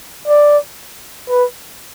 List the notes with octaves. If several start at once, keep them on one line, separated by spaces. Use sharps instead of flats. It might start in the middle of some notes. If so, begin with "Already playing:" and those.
D5
B4